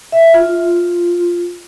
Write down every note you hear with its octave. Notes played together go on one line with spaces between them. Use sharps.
E5
F4